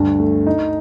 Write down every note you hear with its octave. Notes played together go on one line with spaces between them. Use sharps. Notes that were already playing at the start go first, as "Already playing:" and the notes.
Already playing: D2 G2
A3
D#4